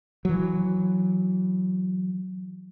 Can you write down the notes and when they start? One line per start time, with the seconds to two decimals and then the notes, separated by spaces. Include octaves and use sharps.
0.25 E3 F#3